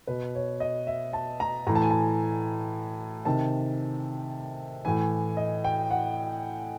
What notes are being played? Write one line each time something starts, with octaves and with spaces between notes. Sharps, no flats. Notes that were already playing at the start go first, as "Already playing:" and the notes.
B2 B4
C#5
D#5
E5
A5
A#5
A2 E3 A#5
A5
G#5
A5
C3 D#3 A5
A2 E3 G#5
D#5
G5
F#5